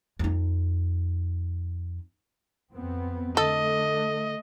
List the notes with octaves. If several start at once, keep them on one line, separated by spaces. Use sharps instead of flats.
F2 D#4
F2 B3 C4
D3 A3 A4 D#5